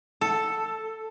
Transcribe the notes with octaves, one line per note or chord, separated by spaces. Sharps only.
A4